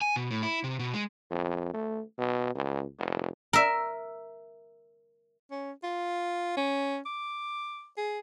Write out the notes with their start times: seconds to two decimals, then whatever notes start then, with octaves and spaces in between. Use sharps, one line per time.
0.02 G#5
0.16 B2
0.31 A2
0.43 E4
0.64 C3
0.79 B2
0.94 G#3
1.30 F2
1.74 A3
2.18 B2
2.55 C#2
2.99 F1
3.53 A#4 E5
5.51 C#4
5.83 F4
6.57 C#4
7.06 D6
7.97 G#4